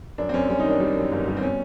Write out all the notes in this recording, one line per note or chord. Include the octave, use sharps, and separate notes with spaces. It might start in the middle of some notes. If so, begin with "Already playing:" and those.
F#2 D4
C4
F#2 C#4
G3 C#4
D#4
D#3
D4
G3
F#2
G1
G3
C4
B2 C#4